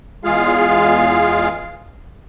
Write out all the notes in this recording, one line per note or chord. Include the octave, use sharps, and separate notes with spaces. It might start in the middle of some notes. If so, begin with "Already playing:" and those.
E2 G#3 F4 G#4 F5